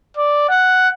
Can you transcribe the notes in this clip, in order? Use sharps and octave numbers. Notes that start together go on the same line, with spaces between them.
D5
F#5